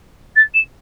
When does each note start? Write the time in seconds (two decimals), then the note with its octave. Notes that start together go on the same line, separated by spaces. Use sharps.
0.36 A6
0.54 E7